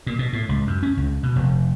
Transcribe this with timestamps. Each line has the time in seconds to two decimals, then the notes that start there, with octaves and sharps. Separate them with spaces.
0.07 A#2
0.19 B2
0.33 A2
0.49 C#2
0.67 F#2
0.83 C#4
0.97 C#2
1.23 B2
1.36 F1